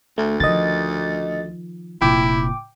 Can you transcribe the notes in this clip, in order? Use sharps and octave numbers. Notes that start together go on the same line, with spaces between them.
D2 A3
D#3 F3 D#5 A6
F1 A#2 E4 G5 D6